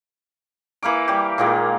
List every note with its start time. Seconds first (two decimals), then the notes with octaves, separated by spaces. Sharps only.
0.82 E3 A#3 F5 D6
1.08 G3 G4
1.38 A#2 D#3 G#3 A#3